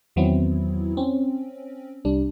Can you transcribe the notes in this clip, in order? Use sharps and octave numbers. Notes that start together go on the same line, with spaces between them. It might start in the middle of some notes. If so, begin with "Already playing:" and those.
E2 D#3 F#3 B3 C4 E4
C4 C#4
C2 G3 D4